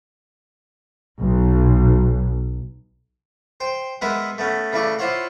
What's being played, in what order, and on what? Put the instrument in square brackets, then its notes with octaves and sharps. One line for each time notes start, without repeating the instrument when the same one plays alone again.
[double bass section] B1
[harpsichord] C5 G5
G#3 B3 D#4 A#4 B4 E5
A3 B3 C#4
C#3 E3 A3 D5 C#6
E4 F4 C5 C#5 F#5